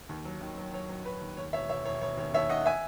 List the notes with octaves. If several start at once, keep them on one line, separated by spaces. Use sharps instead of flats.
D#2
F#3
D#3
F#3
F#3 C#5
F#3
F#3 B4
D#2
D#2 C#5
E1 C#5 E5
E1 C#5 E5
E1 C#5
E1 C#5
D#2 C#5
D#2 C#5 E5
D#3 D#5 F#5
E5 G#5